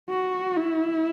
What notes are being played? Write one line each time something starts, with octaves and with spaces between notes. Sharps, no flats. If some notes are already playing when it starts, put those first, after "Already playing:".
F#4
E4